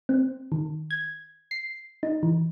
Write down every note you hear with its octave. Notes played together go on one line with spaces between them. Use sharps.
C4
D#3
G#6
C7
D#4
E3